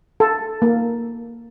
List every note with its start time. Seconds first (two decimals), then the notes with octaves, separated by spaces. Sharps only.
0.20 A4
0.62 A#3